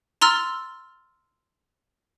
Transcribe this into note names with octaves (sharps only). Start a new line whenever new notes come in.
A#5 C6 E6 F6 A6